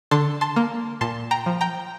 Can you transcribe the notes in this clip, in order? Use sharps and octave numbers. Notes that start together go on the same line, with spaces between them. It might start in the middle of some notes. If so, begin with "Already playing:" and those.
D3 A5 C6
A5 C6
A#3
A#2 A5 C6
G5 A#5
F3
G5 A#5